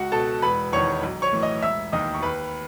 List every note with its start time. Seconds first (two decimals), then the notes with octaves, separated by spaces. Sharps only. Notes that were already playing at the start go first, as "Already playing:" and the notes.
Already playing: C#2 F#4 F#5
0.12 B2 A4 A5
0.42 E1 B4 B5
0.73 E2 D#3 C#5 C#6
1.03 B1
1.22 C#5 C#6
1.33 A2 E3
1.43 D#5 D#6
1.62 E1 E5 E6
1.92 D#2 D#3 D#5 D#6
2.14 C#6
2.23 D#2 B4 B5